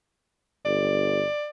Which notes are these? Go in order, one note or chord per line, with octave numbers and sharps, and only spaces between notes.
G1 D5